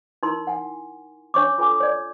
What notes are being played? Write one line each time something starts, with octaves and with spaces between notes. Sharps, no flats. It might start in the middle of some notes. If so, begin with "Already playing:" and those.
D#4 E4 A#4 C6
F#5 G#5
D4 C#5 C#6 D6
F4 A4 G#5 D6
C#5 D5